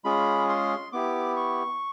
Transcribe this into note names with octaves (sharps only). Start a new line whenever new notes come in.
G#3 C#4 F4 G#4 B5
C6
B3 E4 G4 D6
C#6